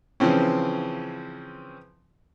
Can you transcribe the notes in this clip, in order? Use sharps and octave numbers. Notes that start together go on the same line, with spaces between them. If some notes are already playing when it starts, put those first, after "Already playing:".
C#3 E3 F3 C4 C#4